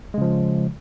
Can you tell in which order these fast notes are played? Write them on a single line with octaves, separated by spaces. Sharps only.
G#3 C#3 F3